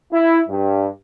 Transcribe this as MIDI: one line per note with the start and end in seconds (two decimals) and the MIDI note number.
0.13 0.39 64
0.49 0.87 43